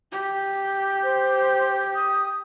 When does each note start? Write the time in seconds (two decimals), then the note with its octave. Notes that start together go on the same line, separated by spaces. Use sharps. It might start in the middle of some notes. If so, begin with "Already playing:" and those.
0.11 G4
1.03 C5
1.95 D#6